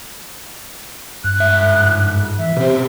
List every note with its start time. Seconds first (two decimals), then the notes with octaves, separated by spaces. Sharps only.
1.24 G2 F#6
1.40 G#2 E5
2.38 E3 E5
2.57 B2 C4 G4 C5